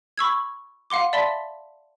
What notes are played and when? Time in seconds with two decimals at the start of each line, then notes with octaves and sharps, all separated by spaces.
0.18 B5 C#6 E6 G#6
0.90 F5 F#5 C6 D6
1.13 D5 E5 A5 B5 C6 B6